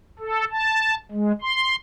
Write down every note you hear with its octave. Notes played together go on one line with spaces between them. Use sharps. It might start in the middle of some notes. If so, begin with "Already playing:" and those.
A4
A5
G#3
C6